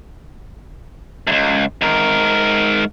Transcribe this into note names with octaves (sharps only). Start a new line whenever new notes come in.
C#2 F#2
G#2 A#4